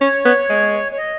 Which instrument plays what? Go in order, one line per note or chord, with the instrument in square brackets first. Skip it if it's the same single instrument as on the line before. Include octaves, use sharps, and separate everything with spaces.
[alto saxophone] C#4 [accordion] C#5
[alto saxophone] B3
G#3
[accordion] C#5
D#5